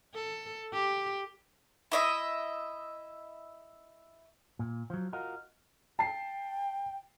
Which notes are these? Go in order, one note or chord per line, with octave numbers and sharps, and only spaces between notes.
A4
G4
E4 D#5 E5
A#2
F3 F#3
F4 F#4 A#4 D#5 F5
G5 A5 C7